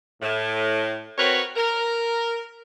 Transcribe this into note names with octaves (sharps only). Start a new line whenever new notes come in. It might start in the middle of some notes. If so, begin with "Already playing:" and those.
A2
C4 F#4 A#4 B4 C#5
A#4